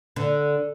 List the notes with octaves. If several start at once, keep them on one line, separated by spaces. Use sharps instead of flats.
D3